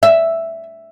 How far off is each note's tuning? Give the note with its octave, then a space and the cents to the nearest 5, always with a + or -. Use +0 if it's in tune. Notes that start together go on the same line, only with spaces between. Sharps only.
E5 +0